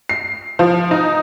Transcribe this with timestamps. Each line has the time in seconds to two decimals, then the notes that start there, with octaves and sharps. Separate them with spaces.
0.09 C7
0.59 F3
0.91 D#4